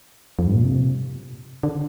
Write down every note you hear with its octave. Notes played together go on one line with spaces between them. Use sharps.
F2
G2
A#2
C3
D3